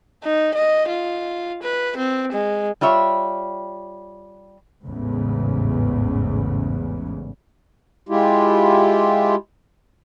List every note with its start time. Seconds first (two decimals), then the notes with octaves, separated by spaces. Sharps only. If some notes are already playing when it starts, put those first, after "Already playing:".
0.24 D#4
0.55 D#5
0.89 F4
1.62 B4
1.97 C4
2.32 G#3
2.81 G3 F4 C#5 E5
4.86 A1 E2 G#2 C#3
8.09 G#3 E4 F4 G4